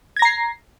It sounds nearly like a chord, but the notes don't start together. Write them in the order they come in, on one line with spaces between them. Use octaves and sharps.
G#6 A#6 A#5 C7